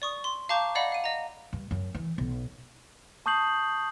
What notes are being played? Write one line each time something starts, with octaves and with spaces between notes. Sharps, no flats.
D5 C#6 D#6
C6
F5 A5 A#5 C#6 D6 G6
D5 D#5 F5 F#5 B5
F5 D#7
D#5 A#5
G2
F#2
E3
B1
A5 C#6 D#6 G6 C7 F#7